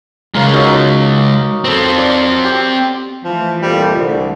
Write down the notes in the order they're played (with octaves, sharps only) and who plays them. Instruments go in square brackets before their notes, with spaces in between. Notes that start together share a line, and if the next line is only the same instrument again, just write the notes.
[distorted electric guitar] C#3 G#3 [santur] A#4 F5
[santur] F#3 D#4 F5
[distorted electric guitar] C4 A4
[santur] D5
G4
[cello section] E3 A3 [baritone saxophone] F3
[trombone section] F2 A#2 F3 [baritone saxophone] G3
[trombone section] C2 [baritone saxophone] D3